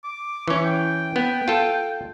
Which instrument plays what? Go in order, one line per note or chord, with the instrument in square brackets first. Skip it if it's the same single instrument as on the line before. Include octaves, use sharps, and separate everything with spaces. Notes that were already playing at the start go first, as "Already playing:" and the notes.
[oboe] D6
[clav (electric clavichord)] E3 C#4 [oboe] C#6
[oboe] G5
[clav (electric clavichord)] B3
F4 A4